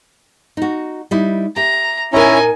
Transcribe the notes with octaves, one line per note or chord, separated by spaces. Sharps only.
D#4 F#4
G3 D#4 E4
G4 E5 A#5
A#2 C#4 D#4 E4 A#4 G#5 A#5